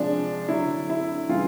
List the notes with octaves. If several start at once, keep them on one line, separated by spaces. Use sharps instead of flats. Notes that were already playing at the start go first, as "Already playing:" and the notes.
Already playing: C3 F3 G#3 D4
D3 F#3 E4
E4
C#3 E3 G3 F4